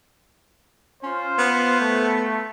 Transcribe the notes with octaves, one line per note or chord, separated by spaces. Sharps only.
C#4 F4 C5
B3
A3